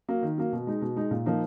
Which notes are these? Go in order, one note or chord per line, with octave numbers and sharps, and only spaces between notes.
F#3 A#3
D#3
F#3 A#3
B2
G#3 D#4
B2
G#3 D#4
A#2
F3 A#3 D#4